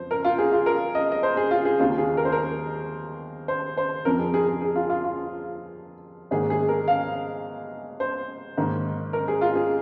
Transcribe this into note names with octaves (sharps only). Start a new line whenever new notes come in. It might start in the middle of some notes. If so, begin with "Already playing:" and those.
Already playing: F2 F3 C5
A#4
F4
G#4
F4
A#4
D#5
D#5
C5
G#4
F4
G#4
D#2 D#3 C4 F4
G#4
A#4
C5
A#4
C5
C5
F2 F3 C4 A#4
G#4
G#4
G#4
G#4
F4
F4
F4
G#2 D#3 A#3 G#4
G#4
A#4
F5
C5
G#2 D#3 A#3
A#4
G#4
F4
G#4